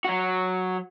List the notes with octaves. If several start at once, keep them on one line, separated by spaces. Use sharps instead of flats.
F#3 F#4